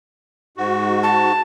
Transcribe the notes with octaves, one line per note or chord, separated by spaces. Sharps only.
G#2 F#4
A5